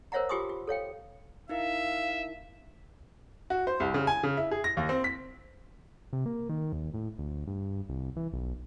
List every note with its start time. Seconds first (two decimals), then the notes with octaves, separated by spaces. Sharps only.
0.12 A#4 C5 C#5 E5 F#5 A#5
0.29 F4 G4 G#5 C6 D6 D#6
0.49 F4
0.67 A4 C#5 F5 G5
1.49 D#4 E4 A#4 E5 F5
3.50 F#4
3.67 C5
3.80 C2
3.94 C#3
4.07 G#5
4.23 C#3
4.37 E4
4.51 G#4
4.64 A#6
4.77 D#2
4.89 C4
5.04 B6
6.13 C3
6.26 A#3
6.49 D#3
6.72 D#2
6.94 A2
7.18 D2
7.47 G2
7.89 C2
8.16 E3
8.33 B1